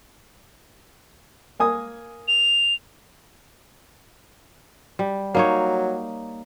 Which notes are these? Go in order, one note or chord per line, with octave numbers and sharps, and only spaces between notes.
A#3 G#5 D#6
F7
G3
F#3 A#3 D#4 C#5